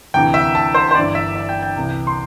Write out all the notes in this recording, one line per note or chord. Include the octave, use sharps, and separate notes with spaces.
D2 C3 E3 G5
E5
A5
C5
C5
G1 G2 E3 D5
E5
E5
G5
G5
C2 C3 E3
C6